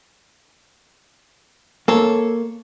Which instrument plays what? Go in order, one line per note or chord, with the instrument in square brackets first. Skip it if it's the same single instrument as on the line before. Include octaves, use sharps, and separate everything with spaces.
[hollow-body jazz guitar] A#3 [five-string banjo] A4 C#5